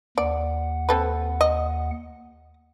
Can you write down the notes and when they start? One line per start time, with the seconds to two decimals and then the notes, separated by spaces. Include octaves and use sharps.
0.18 D#2 D5 F#5
0.89 C4 A4 B4
1.41 D#5